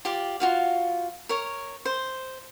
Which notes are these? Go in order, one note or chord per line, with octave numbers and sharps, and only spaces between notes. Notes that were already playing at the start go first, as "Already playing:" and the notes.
F4 G4 D5
F4 F#4 F5
A#4 C#5
C5